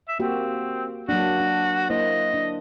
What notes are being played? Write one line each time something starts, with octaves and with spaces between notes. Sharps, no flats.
E5
A#3 C4 F#4 G4
F#3 A#3 D4 F#4
D4
A#3 E4 C5 D#5
D4